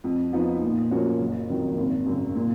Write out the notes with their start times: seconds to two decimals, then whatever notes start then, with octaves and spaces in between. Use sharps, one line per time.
0.04 F2
0.33 F3 B3 D#4
0.62 A#2
0.91 F3 A#3 C#4 F#4
1.19 F#1
1.48 F2 D#3 F#3
1.77 G#1
2.06 F#2 C#3
2.35 A#2